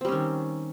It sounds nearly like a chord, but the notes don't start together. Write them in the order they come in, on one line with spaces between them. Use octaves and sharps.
C4 G3 C#4 D#3